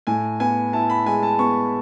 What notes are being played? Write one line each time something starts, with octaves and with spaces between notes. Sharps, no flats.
A2 G#5
B3 G#5
E4 A5
B5
G#3 G#5
A5
B3 C#6